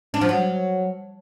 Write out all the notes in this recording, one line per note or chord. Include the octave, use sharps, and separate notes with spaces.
D4
F3
F#3